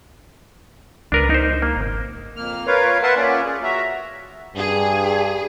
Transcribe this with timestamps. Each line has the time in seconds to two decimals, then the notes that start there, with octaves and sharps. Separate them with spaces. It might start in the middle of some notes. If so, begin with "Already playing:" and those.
1.12 C#2 D4 A#4 B4
1.30 D#4 C5
1.62 A#3
1.77 G#1
2.36 F2 A#3 F6
2.67 F4 A#4 B4 C#5 F5
3.03 A#4 B4 E5 F#5 A5 C6
3.16 A#3 C#4 F4 D5
3.45 G#4
3.63 F#4 E5 A#5
4.56 G2 G#4